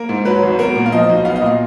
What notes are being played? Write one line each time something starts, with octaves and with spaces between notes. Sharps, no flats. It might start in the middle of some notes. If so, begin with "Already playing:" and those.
Already playing: A#3 A#4
G#2
F#3 B4
G#1
B3 A#4
A#2
F5
F3 D#5
B1
B3 F5
D#5
A#2 F5